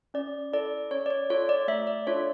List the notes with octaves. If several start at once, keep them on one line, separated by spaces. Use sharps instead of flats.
C#4 D5
E4 A4 D5
C#4 C#5
D5
C#5
F4 A4 C#5
D5
A3 E5
D5
D4 F4 A4 C#5